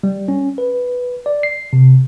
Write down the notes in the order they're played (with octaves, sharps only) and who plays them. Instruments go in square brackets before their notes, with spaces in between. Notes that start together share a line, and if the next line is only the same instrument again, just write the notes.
[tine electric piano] G3
C#4
B4
D5
C7
C3